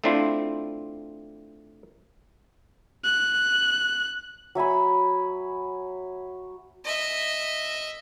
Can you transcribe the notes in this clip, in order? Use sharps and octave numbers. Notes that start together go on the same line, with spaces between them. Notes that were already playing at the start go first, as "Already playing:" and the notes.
A3 C4 D4 E4 F4
F#6
F#3 E5 G#5 B5
D#5 E5